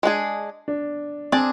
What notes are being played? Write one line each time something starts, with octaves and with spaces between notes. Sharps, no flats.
G#3 D4 G#4
D4
C4 D4 G#4 D5